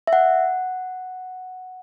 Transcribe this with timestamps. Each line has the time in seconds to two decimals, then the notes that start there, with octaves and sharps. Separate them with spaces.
0.07 E5
0.13 F#5